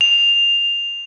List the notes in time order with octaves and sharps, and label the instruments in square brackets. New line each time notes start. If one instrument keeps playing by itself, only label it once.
[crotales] F7